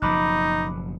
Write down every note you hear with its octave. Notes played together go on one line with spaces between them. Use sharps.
F#1 B2 F3 D#4 B5 D6 F#6